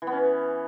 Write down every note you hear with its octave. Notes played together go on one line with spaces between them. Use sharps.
E3
B3
C#4